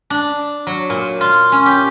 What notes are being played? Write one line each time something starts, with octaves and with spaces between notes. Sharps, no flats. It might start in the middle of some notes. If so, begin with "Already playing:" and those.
D4
F#3
A#2
F4
C#4
G4